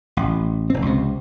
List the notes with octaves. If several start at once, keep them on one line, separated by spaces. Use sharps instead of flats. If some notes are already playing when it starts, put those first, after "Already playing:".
A1
F1 C4
C#2 C3